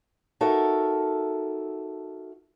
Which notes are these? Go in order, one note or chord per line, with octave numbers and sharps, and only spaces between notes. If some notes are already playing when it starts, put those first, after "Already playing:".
D#4 F#4 A4 A#4 E5